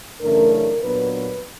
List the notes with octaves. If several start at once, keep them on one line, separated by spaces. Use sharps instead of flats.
F#2 C#3 E3 A3 D4 A#4
A#4
A#2 F#3 B3 D4 B4
B4